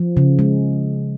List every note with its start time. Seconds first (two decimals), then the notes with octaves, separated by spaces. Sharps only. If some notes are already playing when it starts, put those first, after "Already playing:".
Already playing: F3
0.17 C#3
0.39 G#3